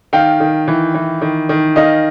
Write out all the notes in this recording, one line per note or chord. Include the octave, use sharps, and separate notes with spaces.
D#3 F5 G5
D#3
E3
E3
D#3
D#3
D#3 D#5 F5